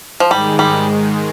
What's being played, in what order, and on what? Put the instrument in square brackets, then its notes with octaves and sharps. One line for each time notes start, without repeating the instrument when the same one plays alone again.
[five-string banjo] F3
[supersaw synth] G#2 D#3 G#3 [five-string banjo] G3
[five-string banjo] G3